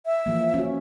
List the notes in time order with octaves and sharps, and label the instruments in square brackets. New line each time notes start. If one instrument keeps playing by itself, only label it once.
[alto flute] E5
[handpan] E3 F3 A#3
C#4 F#4